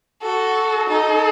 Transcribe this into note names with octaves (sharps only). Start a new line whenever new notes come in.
F#4 A4
D#4 A4